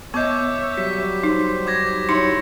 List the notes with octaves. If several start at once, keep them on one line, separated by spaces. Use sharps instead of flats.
B3 C#5 D#5 E5 C#6 D6 G6
F#3 G3 B6
D#4 C5
D6 G#6 A#6
D#4 E4 C#5 C6 C#7